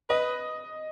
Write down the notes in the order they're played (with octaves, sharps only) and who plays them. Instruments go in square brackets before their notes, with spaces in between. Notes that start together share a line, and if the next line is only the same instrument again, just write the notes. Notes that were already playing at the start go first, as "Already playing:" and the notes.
[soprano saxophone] B4 [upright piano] D#5